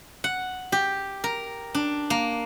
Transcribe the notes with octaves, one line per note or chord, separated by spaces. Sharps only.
F#5
G4
A#4
D4
A#3